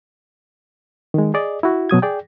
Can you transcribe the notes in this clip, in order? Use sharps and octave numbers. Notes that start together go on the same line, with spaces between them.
D#3 G#3
G#4 D5 D#5
E4 F#4
B2 F#3 D#6 G#6
G#4 D5 G5